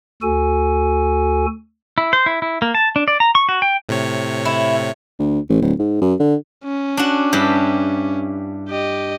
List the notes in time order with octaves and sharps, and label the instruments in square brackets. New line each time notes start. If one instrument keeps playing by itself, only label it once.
[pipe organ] D2 F#4 A4 G#5
[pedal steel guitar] E4
C5
E4
E4
A#3
A5
D4
D5
A#5
C#6
F#4
G5
[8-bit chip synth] A2 C3 C#5
[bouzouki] E4
[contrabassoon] D2
A1
D1
G#2
F#2
D3
[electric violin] C#4
[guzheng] D4 F#4
G2 E4 G4
[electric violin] G4 D#5